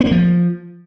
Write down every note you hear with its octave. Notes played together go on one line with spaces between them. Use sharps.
B3
A#3
F3